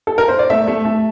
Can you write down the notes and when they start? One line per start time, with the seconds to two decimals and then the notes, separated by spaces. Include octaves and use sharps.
0.07 A4
0.18 A#4
0.28 C5
0.39 D5
0.50 A3 E5
0.68 A3
0.85 A3